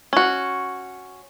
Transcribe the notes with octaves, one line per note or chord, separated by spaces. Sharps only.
C#4 F#4